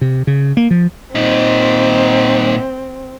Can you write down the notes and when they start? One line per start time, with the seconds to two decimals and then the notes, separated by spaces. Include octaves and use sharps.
0.01 C3
0.27 C#3
0.57 A#3
0.71 F3
1.15 A#2 C4 D#4